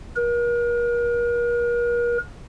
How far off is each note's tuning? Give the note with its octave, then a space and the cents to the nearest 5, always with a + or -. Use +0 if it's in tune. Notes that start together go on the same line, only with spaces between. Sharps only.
A#4 +40